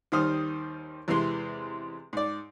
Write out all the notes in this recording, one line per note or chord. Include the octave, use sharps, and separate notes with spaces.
D#2 D#3 G3 C5 D#6 F6
E2 C3 E3 G#3 C6
G#2 D5